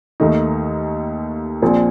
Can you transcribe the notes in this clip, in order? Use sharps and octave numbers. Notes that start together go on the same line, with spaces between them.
D#2 D#3 A3 D#4
A#1 A#2 F3 C4